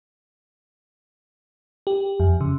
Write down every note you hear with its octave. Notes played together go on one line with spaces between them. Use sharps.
G4
F2
C#3